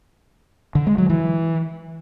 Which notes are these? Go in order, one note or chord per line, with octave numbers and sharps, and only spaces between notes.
D3
G#3
F#3
E3